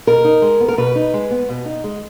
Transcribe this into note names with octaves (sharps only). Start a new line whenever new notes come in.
B2 A#4
D#4
G#3
B3
A#4
B2 B4
D#4
G#3
B3
B2
D#4
G#3